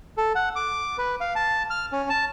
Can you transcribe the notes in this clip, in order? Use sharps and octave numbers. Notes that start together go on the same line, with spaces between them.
A4
F#5
D6
B4
F5
A5
F6
C#4
A5